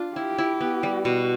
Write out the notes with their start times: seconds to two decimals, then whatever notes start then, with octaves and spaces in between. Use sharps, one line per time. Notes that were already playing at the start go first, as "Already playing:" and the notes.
Already playing: D4 F4
0.15 E4 G4
0.38 E4
0.61 B3
0.83 G3
1.05 B2 F#4